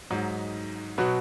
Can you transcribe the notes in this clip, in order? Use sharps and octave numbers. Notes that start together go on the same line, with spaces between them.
G#2 F#3 D#4
B2 F#3 B3 F#4